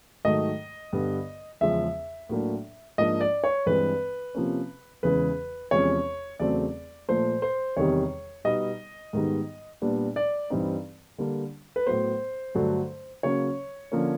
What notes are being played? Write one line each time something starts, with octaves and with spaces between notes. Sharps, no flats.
G#2 D#3 F#3 A3 D#5
G2 D3 G3 B3
E2 C#3 F3 G#3 C#4 E5
A2 F#3 A#3 D4
G#2 F3 A#3 D4 D#5
D5
C#5
G2 E3 G#3 C4 B4
C3 F3 A#3 C#4
E2 C#3 E3 G#3 B4
E2 C3 F3 G#3 C#4 C#5
E2 C#3 F#3 A3 C4 D5
A#2 F3 A3 C5
C5
E2 C3 D#3 G3 C#5
B2 G3 B3 D#4 D#5
G#2 D#3 G3 B3 D#4
A#2 G3 B3 D4
D5
G2 E3 G3 C4 D#4
D3 G3 A#3 D4
B4
A2 F#3 B3 C5
G2 D3 F#3 A3
C#3 F#3 A#3 C#4 C#5
D3 F3 A#3 C#4